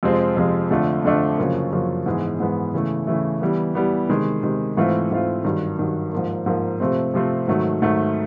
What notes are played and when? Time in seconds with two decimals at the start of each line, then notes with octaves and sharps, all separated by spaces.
0.03 F2 C3 F3 G#3 C4
0.37 F2 C3 F3 G#3 C4
0.71 F2 D3 F3 A3 D4
1.04 F2 D3 F3 A3 D4
1.38 F#2 C#3 F3 A#3
1.72 F#2 C#3 F3 A#3
2.06 G#2 E3 G#3 B3
2.40 G#2 E3 G#3 B3
2.74 C#3 E3 A3
3.07 C#3 E3 A3
3.41 E3 G3 B3
3.75 E3 G3 B3
4.09 C3 D#3 G#3
4.43 C3 D#3 G#3
4.77 G#2 E3 A3 C4 F4
5.11 G#2 E3 A3 C4 F4
5.44 G2 D#3 F#3
5.78 G2 D#3 F#3
6.12 G#2 F3 A#3
6.46 G#2 F3 A#3
6.80 C3 F3 A3 C4
7.14 C3 F3 A3 C4
7.48 G#2 D#3 F#3 A3
7.82 G#2 D#3 F#3 A3